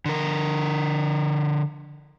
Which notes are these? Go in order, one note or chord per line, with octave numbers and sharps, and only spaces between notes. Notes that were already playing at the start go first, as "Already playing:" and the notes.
D3 A#4